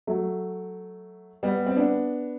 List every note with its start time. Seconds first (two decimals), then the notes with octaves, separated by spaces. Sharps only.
0.07 F#3 A3
1.43 G3 B3
1.66 C4
1.76 B3 D4